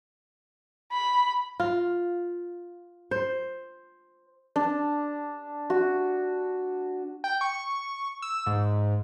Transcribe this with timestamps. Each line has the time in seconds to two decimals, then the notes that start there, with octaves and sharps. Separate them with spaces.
0.92 B5
1.60 F4
3.11 C5
4.56 D4
5.70 F#4
7.24 G5
7.41 C#6
8.22 E6
8.46 G#2